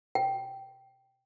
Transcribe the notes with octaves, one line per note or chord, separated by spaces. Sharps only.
G5